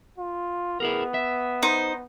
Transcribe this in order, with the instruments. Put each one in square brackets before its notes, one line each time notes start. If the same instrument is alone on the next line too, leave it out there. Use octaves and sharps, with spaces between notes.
[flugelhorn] F4
[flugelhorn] B3 [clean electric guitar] E4 G#4 A#4
[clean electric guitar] E5
[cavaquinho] D#4 C5